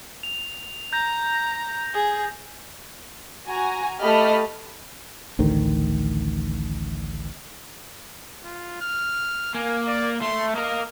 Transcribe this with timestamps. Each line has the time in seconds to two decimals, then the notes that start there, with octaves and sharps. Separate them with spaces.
0.23 F7
0.93 A#5 G6 A#6
1.94 G#4
3.47 F#4 G#5 A#5
4.02 A3 G4 D#5 A5 B5 F6
5.39 A1 D2 D#3
8.44 F4
8.81 F6
9.55 A#3 G#5
9.87 D5
10.21 A3 C6
10.56 A#3 A#4 D#5